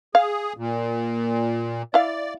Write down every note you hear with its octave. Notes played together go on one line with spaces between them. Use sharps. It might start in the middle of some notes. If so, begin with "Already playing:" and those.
G#4 F5
A#2
E4 D5 F5